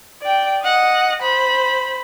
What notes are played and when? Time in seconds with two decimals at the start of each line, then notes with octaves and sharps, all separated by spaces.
0.22 D5 G5
0.63 D#5 F#5
1.22 C5 B5